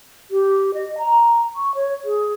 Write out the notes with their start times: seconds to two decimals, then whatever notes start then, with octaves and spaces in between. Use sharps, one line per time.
0.31 G4
0.74 D#5
0.98 A#5
1.56 C#6
1.75 C#5
2.05 G#4